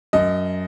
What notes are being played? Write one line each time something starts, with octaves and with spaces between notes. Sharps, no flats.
F#2 D#5